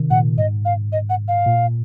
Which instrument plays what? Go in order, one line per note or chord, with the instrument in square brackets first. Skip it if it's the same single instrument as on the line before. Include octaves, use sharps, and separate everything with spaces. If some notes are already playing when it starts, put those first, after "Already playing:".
Already playing: [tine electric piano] C3 D#3
[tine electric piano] A#2 [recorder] F#5
[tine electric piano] G#2 [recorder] D#5
[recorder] F5
D#5
F#5
F5
[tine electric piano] A#2